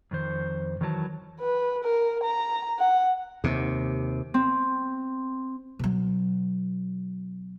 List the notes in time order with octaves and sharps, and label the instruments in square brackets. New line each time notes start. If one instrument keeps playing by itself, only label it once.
[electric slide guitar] F2 D#3 C5
D#3 E3 F#3 A5
[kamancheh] B4
A#4
A#5
F#5
[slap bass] D#2 C3
[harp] C4
[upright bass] B2 F#3